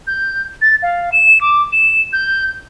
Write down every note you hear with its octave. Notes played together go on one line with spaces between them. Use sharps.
G6
A6
F5
E7
D6
E7
G6